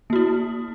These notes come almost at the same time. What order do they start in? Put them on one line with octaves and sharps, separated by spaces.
A#3 F#4 E4